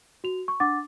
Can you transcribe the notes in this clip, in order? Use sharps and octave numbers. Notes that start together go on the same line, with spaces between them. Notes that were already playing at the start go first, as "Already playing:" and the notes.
F#4 F7
C#6
D4 F#5 D6 A6